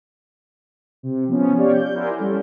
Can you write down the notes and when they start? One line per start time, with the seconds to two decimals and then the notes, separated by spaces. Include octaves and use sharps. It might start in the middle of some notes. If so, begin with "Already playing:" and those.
1.03 C3
1.28 F3 B3 C#4
1.57 G4 C#5 D5 F5
1.73 G6
1.95 E4 A#4 C5 D5 F#5 G#5
2.18 G3 C#4 A4